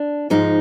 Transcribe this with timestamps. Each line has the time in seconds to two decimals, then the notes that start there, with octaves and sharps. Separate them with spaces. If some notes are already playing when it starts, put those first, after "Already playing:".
Already playing: D4
0.30 G#2 F3 G#3 D#4